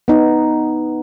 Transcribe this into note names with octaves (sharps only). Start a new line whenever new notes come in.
B3 D#4